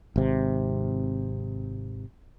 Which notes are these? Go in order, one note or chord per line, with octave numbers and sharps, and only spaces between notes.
G#1 C3